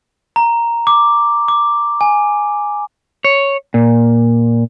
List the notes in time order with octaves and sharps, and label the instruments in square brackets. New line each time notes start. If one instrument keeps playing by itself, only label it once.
[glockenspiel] A#5
D6
D6
G#5
[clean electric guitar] C#5
A#2